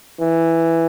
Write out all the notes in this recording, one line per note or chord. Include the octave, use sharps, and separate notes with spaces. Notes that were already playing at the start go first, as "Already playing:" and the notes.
E3